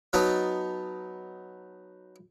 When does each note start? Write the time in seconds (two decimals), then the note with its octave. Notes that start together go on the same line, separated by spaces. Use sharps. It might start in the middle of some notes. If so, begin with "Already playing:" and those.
0.13 F#3 B3 D#4 A5